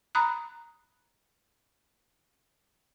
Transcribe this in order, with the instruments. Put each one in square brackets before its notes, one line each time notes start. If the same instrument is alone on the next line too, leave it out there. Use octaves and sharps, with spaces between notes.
[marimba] A#5 B5 D#6 F#6